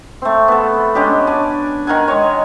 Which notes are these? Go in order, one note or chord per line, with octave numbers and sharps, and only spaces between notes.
A3 C4
B3 A4
G#3 C#4 D4 G4
D4 D5 G#5
D#3 A#4 F#5 G#5
G#3 C#5